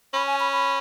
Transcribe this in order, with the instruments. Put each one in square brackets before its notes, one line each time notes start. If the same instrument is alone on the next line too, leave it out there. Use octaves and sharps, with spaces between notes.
[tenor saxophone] C#4 [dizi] B5
[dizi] G#5
B5
B5